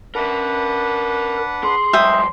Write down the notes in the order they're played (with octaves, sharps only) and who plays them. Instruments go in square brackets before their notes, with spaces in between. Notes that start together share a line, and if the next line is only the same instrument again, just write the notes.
[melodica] D4 B4 F#5 [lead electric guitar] A#4 E5
[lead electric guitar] G#4 [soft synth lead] C6
[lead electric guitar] F3 G3 [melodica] G#3 [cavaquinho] E5 G5 D#6